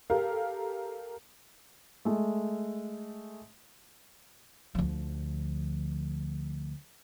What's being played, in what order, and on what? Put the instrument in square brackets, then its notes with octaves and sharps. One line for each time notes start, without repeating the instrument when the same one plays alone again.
[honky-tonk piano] G4 A4 A#4 F5
[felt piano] G#3 A3
[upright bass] D2 F3